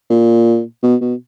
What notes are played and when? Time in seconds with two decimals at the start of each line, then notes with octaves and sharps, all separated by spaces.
0.10 A#2
0.83 B2
1.01 B2